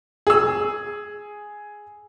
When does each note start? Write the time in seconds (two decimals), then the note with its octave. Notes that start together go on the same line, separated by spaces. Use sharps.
0.27 G#4 E6